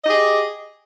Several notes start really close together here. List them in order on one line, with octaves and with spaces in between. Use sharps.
D#5 G4 G#4